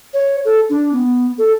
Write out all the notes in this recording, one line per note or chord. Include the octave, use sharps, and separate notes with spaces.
C#5
A4
D4
B3
A4